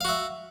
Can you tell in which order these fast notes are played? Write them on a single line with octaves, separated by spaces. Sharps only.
F5 F#4 E5